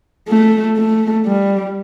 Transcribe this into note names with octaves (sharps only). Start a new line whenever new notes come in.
A3
A3
G3